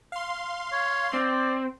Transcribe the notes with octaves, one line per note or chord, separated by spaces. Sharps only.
F5 C6
C#5
C4 D5